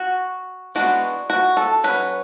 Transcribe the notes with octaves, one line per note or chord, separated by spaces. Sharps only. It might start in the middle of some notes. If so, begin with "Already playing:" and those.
Already playing: F#4
E3 G#3 B3 D4 F#4
F#4
A4
F#3 C#4 B4